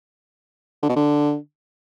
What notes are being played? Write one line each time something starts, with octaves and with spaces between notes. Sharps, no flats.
D3
B2
D3